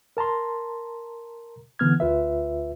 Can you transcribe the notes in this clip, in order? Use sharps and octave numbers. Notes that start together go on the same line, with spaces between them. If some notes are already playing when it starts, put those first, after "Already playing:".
A#4 A5 A#5 C6
D3 E3 B3 F6 G#6
D2 F4 B4 E5